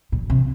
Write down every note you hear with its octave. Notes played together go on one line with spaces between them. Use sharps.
A#2
C3